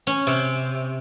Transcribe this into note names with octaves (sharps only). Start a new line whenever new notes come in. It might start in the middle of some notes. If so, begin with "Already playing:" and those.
C#4
C3